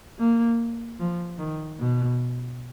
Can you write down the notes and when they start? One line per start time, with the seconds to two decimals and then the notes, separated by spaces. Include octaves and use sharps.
0.19 A#3
1.00 F3
1.39 D#3
1.79 B2